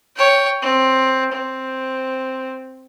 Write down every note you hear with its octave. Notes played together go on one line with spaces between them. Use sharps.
C#5 G5
C4
C4